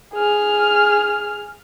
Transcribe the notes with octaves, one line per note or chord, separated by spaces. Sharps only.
G#4 F6